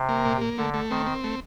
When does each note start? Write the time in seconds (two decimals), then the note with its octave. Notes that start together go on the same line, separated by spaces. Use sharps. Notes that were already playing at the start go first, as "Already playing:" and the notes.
Already playing: C3
0.09 A#3
0.25 A#2
0.41 A#3
0.57 D3 A3
0.74 A3
0.90 D#3 C4
1.06 C4
1.24 A3